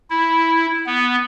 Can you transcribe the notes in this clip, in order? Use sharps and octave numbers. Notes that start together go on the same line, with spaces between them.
E4
B3